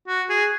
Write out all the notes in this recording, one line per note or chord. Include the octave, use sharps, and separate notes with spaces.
F#4
G#4